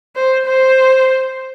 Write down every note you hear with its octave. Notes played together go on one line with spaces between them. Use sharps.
C5
C5